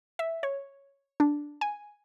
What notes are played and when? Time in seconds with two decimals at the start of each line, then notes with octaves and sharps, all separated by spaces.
0.19 E5
0.43 C#5
1.20 D4
1.61 G#5